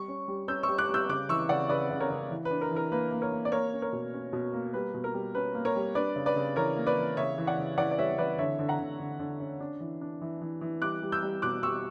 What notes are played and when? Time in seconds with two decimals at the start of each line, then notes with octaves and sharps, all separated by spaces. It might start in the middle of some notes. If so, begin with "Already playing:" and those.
Already playing: G3 C#6
0.08 C#4
0.28 G3
0.48 C#4 E6 G6
0.63 G3 C#6 E6
0.78 D6 F#6
0.89 G3
0.94 E6 G6
1.09 C#3 D6 F#6
1.29 E3 C#6 E6
1.49 C#3 D5 F#5
1.69 C#3 B4 D5
1.91 C#3
2.00 A#4 C#5
2.10 C#3
2.30 E3
2.45 B4
2.51 D4
2.61 A#4
2.71 E3
2.76 A#4
2.92 A#3 B4
3.11 A#3
3.22 A#4 C#5
3.32 A#3
3.45 D5
3.52 A#3 A#4 C#5
3.73 C#4
3.82 A#4 C#5
3.92 B2
4.14 C#4
4.33 B2
4.54 A#3
4.74 G3 B4
4.94 B2
5.04 A#4
5.14 G3
5.35 C#4 B4
5.55 A#3
5.65 A#4 C#5
5.76 G3
5.95 D4 B4 D5
6.16 C#3
6.26 B4 D5
6.36 C#3
6.56 E3 A#4 C#5
6.77 A#3
6.87 B4 D5
6.97 E3
7.17 C#3 C#5 E5
7.38 E3
7.47 D5 F#5
7.58 C#3
7.78 E3 D5 F#5
7.91 D5
7.98 G3 C#5 E5
8.18 E3 B4 D5
8.38 D3 C#5 E5
8.59 D3
8.69 F#5 A#5
8.79 D3
9.00 D3
9.19 D3
9.40 C#4
9.60 D4
9.80 E3
10.01 D4
10.22 E3
10.42 E3
10.61 E3
10.82 G3 D6 F#6
11.02 G3
11.12 E6 G6
11.22 G3
11.42 B2 D6 F#6
11.63 G3 C#6 E6